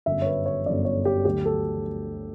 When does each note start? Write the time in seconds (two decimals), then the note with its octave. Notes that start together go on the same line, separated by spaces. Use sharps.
0.06 G1 F#2 D3 E5
0.22 C#5
0.26 B4
0.46 C#5
0.66 G1 F#2 D3 D5
0.85 C#5
1.05 G4
1.24 D2 D3 F#3 G4
1.45 A4